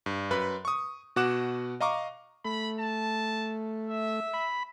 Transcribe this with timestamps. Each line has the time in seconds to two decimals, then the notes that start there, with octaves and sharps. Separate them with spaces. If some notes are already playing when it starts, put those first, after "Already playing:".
0.06 G2
0.31 F#2 B4 B5
0.65 C#6 D#6
1.16 B2 F#4 F#5 D6 F#6 E7
1.81 D#5 F5 A#5 C#6 D6
2.45 A3 B5
2.80 A5
3.88 E5
4.34 B5